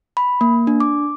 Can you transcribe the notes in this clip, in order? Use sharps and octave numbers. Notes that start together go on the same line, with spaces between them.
B5
A#3
D4
D6